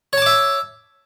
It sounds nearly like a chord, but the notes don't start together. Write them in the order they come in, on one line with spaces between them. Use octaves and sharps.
C#5 A5 D6 E5